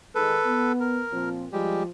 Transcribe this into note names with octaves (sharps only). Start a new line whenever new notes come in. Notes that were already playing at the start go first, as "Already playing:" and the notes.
D#3 G#3 A4 B4
B3
A#4
A#2 F3 C4
F3 G3 G#3 G4